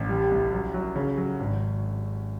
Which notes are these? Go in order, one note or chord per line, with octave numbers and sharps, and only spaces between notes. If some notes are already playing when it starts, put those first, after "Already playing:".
Already playing: A1
G3
C2
F#3
F#3
C#3
F#3
G#1